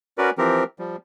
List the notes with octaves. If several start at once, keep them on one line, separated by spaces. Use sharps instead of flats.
C#4 F#4 A#4 B4 D5
E3 F3 C4 G4 A#4
F3 G3